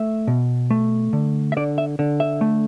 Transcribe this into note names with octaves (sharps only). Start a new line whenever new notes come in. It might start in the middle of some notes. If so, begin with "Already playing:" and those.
Already playing: A3 E5
B2
A3
D3
E5
D3 D5
E5
D3
E5
A3